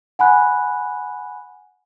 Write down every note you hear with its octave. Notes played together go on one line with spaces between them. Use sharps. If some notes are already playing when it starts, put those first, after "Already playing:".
F#5 G#5 B5 F#6